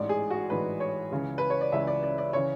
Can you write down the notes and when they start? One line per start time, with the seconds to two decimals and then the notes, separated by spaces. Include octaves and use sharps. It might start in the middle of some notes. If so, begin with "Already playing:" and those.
Already playing: A1 G#2 E3 D5
0.09 G#4
0.30 F#4
0.50 A1 G#2 E3 B4
0.80 C#5
1.11 C#2 C#3 E3
1.38 B4
1.50 C#5
1.61 D5
1.72 C#2 C#3 E3 E5
1.87 D5
2.03 D5
2.18 D5
2.33 C#3 E3 C#5